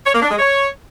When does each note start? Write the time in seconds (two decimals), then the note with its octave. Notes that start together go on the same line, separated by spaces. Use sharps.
0.05 C#5
0.14 A#3
0.22 D4
0.30 G#3
0.38 C#5